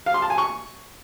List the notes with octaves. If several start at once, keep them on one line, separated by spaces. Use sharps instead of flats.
F5
C6
A5
G#5
C#6